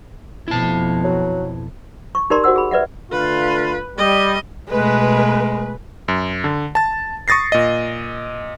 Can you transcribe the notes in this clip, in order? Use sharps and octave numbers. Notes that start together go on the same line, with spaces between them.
F2 B2 E4 A5
F#3
C#6
D#4 G4 A#4 D5 A#5 C6
F#4 C5 F#5 E6
G#4 B5
B4 D5 E5 F#5
D3 A3 F4 B4
G3 D#5
B2 G#3 A3 B4
F#2
D3
A5 A6
C#6 D#6 A6 A#6 C7
A#2 D#5